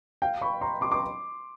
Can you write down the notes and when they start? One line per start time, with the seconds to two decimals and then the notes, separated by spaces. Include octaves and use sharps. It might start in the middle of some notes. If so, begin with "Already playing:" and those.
0.22 F5 G5
0.41 B5 C#6
0.61 A#5 C6
0.81 C6 D6
0.91 C6 D6